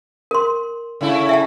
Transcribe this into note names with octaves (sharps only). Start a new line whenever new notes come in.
A#4 C6
C#3 A3 E4
E5 G5 A5